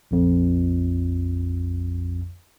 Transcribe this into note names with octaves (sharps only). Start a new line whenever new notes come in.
A#1 F2